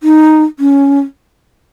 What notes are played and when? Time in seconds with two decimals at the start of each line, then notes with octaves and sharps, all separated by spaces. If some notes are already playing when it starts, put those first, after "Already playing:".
0.03 D#4
0.59 C#4